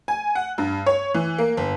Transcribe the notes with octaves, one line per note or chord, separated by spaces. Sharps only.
G#5
F#5
G2
C#5
E3
A#3
G1